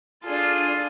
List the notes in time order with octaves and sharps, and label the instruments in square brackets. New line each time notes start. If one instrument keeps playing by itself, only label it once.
[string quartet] D4 F4 G#4 A4